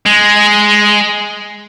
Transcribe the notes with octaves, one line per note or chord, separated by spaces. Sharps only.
G#3